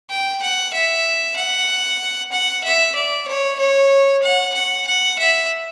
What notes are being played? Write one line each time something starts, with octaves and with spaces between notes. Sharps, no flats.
G5
F#5
E5
F#5
F#5
E5
D5
C#5
C#5
F#5
F#5
F#5
E5